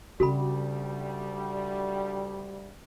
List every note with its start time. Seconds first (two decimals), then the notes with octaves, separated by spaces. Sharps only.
0.20 D2 C#3 G3 F#4 A4 B5